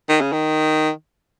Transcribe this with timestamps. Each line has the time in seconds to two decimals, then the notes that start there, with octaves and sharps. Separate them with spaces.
0.09 D#3
0.21 C#3
0.32 D#3